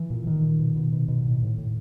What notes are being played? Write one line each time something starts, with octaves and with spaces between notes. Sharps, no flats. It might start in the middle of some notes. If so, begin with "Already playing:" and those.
Already playing: E3
A#2
A#2 D#3
A#2
B2
B2
B2
B2
A2
A2
A2